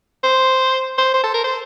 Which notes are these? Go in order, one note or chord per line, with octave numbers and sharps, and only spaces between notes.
C5
C5
C5
A4
A#4
C5